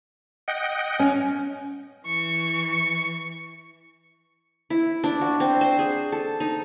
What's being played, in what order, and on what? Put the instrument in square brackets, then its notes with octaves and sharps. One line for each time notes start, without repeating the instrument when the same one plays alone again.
[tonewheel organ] D#5 F#5 G5
[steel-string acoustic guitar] C#4
[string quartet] E3 C#6
[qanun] E4
D4
F#4
C4
C5
G#4
A4
D#4